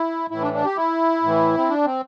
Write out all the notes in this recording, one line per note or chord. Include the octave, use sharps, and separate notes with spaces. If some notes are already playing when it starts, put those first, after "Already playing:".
Already playing: E4
A2 E3 E4
D4
D4
G4
E4
A2 E3
C4
D4
C4